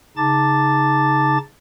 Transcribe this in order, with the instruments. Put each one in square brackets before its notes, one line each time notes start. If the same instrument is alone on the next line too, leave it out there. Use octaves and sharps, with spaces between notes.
[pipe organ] C#3 D#4 A5 D6 A6